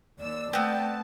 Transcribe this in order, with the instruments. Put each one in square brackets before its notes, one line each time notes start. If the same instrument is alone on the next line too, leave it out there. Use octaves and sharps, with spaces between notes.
[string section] D#2 E6 [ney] D5
[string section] A3 A5 [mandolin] B3 C4 [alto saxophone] G5